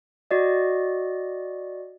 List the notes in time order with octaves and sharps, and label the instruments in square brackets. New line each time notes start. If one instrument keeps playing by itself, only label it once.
[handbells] F#4 D5 D#5